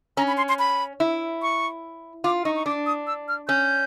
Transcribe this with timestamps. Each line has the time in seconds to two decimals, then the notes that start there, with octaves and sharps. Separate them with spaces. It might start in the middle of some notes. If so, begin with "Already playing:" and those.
0.17 C#4 A#5
0.28 B5
0.37 C6
0.49 C6
0.59 B5
1.00 E4
1.42 C#6
2.24 F4 D6
2.45 D#4 C#6
2.56 C#6
2.66 D4 D6
2.86 D#6
3.07 E6
3.28 F6
3.48 C#4 G6